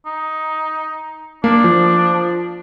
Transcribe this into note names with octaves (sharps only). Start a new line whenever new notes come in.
D#4
A#3 D4
F3